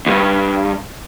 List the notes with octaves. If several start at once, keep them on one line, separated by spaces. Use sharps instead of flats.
D2 G2